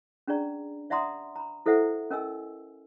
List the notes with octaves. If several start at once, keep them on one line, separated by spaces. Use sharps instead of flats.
C#4 D4 G#4 D5 A#5
D5 E5 F#5 A#5 C6 D#6
A#5 B5
E4 A4 C5 E5 F#5
C#4 A#4 D#5 G#5 E6